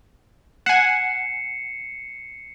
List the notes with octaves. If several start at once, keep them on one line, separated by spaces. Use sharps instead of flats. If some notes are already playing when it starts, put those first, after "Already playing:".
F#5 G#5 C7 C#7 E7